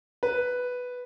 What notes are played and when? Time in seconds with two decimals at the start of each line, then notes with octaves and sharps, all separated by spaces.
0.23 B4